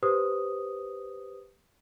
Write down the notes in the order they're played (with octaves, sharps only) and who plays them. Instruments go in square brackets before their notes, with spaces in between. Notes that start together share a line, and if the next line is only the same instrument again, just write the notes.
[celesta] G4 B4 C5 D#6